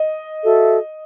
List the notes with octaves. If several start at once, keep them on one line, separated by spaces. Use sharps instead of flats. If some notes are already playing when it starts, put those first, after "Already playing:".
Already playing: D#5
F#4 A4 E5